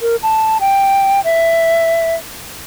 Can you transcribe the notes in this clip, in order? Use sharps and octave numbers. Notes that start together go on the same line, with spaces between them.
A#4
A5
G5
E5